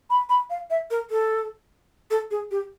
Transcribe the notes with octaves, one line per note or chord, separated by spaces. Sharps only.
B5
B5
F5
E5
A#4
A4
A4
G#4
G4